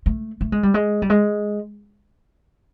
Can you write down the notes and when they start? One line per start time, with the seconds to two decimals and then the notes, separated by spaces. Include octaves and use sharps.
0.06 A3
0.41 A3
0.52 G#3
0.63 G3
0.74 G#3
1.02 G3
1.10 G#3